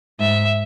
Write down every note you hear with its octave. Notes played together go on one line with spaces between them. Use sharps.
G#2 E5